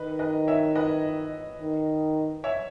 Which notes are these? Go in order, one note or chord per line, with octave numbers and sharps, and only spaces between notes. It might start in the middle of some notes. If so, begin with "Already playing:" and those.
Already playing: D#3 B4 D#5
B4 D#5
C#5 E5
B4 D#5
D#3
C#5 E5